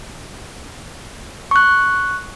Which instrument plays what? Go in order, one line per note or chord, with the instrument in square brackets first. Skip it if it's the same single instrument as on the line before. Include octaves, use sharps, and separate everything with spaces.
[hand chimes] C#6 F#6